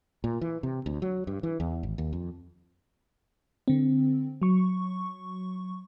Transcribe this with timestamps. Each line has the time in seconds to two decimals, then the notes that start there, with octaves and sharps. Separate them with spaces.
0.24 A#2
0.41 E3
0.63 C3
0.86 D2
1.02 F#3
1.27 G2
1.43 E3
1.60 E2
1.83 G#1
1.98 D#2
2.13 F2
3.68 D3 C4
4.42 F#3 C#6